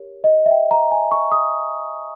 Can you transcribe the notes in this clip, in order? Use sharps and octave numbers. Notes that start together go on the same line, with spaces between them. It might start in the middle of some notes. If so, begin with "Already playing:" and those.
Already playing: G4 A#4 C#5
D#5
E5
G5
A#5
G#5
C#6
D#6